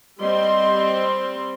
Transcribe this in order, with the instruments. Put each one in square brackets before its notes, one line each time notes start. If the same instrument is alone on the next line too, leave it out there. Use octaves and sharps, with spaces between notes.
[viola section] G3 C4 C6 [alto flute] D#5